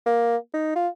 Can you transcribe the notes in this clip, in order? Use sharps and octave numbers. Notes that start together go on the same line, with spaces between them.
A#3
D#4
F4